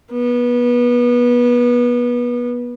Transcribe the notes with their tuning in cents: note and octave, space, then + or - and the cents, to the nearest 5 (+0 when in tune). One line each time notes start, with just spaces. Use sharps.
B3 -25